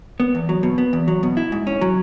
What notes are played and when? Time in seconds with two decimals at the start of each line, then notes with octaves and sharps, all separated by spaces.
0.20 B3
0.35 E2
0.49 F#3
0.63 B2
0.78 B3
0.93 E2
1.08 F#3
1.23 B2
1.37 E4
1.52 G#2
1.67 C#4
1.81 F#3